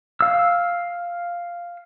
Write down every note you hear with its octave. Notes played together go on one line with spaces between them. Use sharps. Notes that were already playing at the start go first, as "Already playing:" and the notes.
F5 E6